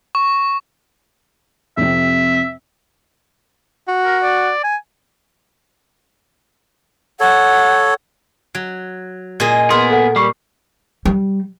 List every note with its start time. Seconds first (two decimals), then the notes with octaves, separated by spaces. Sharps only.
0.15 C#6
1.77 F2 C3 E5
3.88 F#4
4.05 A#4
4.23 D5
4.64 G#5
7.20 A4 C#5 F#5
8.55 F#3
9.40 A#2 G#4 D#5
9.70 B3 G#4 A#4 C6
9.90 A4 F#5
10.16 G3 C#6 C7
11.05 G3